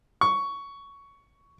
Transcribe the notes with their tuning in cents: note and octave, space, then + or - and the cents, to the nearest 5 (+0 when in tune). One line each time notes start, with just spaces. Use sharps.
C#6 +10